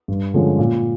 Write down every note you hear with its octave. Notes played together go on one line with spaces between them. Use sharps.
G2
D3 F3 G#3 C#4
A#2